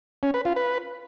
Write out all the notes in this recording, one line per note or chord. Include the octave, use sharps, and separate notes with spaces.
C#4
B4
F4
B4